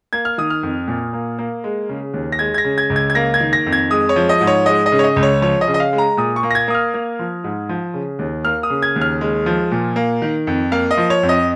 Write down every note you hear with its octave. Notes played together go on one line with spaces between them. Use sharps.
A#3 G#6
F6
D#3 D#6
F6
F2
A#2
A#3
A#3
G#3
C#3
D#2
A#6
G#3 G#6
G#6
A#6
C#3
G#6
C#2
G#6
G#6
A#3 A#6
G#6
D#3
A#6
F2
G#6
G#3 D#6
C#5
F3
D#5
G#2
C#5
G#3 D#5
D#5
C#3
C#5
D#5
C#2
C#5
F3 C#5
D#5
C#3
D#5
F5
G#3
A#5
A#2 D#6
C#6
A#3
A#6
G#6
A#3 D#6
F6
A#3
F3
G#2
F3
C#3
D#2
A#3 F6
D#6
C#3
G#6
D#2
F6
G#3
F3
A#2
A#3
D#3
F2
A#3 F5
D#5
F3
C#5
F2
D#5